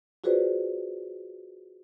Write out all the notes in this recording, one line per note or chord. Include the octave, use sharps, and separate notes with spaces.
F4 F#4 G#4 B4 C5 D5